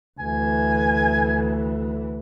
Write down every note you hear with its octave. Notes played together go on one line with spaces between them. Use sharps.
D2 E3 G#5